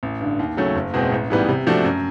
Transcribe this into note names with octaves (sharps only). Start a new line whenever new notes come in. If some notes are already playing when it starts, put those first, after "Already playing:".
A1
G2 D3
D#2
C#3 F#3 A3 C#4
F#1
E2 B2 G#3 C4
A1
G#2 E3 G3 B3
C3
F3 A3 D4 F#4
F#2